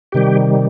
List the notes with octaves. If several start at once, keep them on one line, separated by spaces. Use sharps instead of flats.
C3 D#3 G3 G4